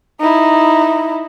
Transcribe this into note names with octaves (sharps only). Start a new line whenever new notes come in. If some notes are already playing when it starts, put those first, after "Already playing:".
D#4 E4